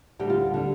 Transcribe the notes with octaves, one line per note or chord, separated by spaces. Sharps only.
D2 D3 G3 G4
F4
D3 G3